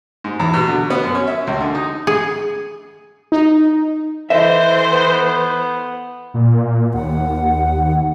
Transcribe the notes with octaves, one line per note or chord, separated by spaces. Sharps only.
G#2
E2
B2
D3
B3
F#2
C#4
E5
C#2
D3
D#4
G#4
D#4
E3 A4 C5 D#5 E5
B3
A#2
D#2 F#5